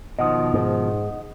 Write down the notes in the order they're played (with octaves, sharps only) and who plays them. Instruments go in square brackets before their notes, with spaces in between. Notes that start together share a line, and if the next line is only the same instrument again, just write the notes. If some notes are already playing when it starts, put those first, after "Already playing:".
[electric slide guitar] B2 D#3 F3 [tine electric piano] D#5 F#5 D#6
[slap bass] G#2